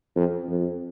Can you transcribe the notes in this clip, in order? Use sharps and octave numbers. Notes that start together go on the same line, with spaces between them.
F2
F2